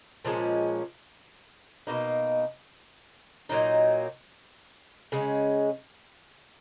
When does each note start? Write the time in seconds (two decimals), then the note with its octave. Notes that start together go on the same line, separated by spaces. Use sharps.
0.25 A#2 F3 G#3 C#4
1.87 B2 A#3 D#4
3.49 A#2 F#3 A#3 D#4
5.12 C#3 G#3 C#4